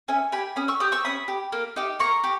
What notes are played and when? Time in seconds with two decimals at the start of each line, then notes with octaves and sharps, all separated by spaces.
0.08 C#4 E5 G#5
0.32 G4 G#5 B5
0.56 C#4 B5 D#6
0.68 C#6 E6
0.80 G4 D#6 G6
0.92 C#6 E6
1.05 C#4 B5 D#6
1.28 G4
1.52 A#3
1.76 D#4 G4
2.00 A#3 A#5 C#6
2.24 G4